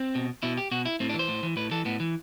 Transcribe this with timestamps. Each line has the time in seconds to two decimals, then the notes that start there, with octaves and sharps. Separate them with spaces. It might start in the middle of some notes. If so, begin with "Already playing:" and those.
Already playing: C4
0.15 B2
0.43 B2 E4
0.57 G4
0.71 B2 F#4
0.86 E4
1.00 A2 C4
1.09 D4
1.14 E3
1.19 C5
1.28 A2
1.43 E3
1.57 A2 B4
1.71 E3 A4
1.85 A2 B3
2.00 E3